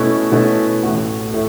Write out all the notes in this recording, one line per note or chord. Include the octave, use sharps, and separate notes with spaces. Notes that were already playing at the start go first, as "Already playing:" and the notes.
Already playing: B2 A3 C#4 E4
B2 A3 C#4 E4
A1 A2 A3 F#4
A2 A3